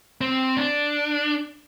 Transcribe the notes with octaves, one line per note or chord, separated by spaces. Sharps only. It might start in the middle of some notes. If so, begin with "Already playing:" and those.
C4
D4